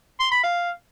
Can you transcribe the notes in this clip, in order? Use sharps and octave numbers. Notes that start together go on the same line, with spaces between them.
C6
B5
F5